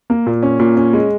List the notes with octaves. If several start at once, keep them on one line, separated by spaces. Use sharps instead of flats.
A#3
A#2
C#4
A#2
C#4
G#3